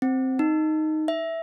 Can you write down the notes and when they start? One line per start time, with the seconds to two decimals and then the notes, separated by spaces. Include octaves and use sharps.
0.02 C4
0.39 D#4
1.08 E5